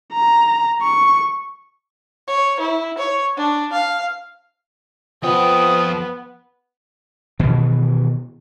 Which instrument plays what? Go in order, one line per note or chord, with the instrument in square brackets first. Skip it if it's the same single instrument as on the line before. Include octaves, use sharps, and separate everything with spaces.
[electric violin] A#5
C#6
[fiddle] C#5
E4
C#5
D4
F5
[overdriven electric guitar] F2 G5 [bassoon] F3 [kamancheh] B3 [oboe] D#6
[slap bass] B2 D#3 E3